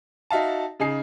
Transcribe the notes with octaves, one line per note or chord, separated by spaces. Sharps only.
D#4 F#4 E5 F5 A5
C#3 D#4 G#4 C7